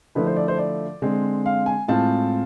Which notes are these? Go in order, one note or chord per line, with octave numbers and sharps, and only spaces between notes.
D3 F3 A3 E4 B4
C5
D5
C5
D5
D3 G#3 C4
F5
G#5
A2 G#3 C4 F4 A5